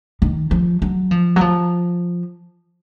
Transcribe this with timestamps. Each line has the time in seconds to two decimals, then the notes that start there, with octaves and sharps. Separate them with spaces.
0.22 D#3
0.51 F3
0.82 F#3
1.11 F3
1.36 F#3
1.41 F3